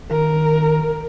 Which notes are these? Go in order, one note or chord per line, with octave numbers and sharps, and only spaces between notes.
D#3 A#4